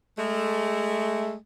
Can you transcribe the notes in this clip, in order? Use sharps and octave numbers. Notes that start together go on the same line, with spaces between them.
G#3 A3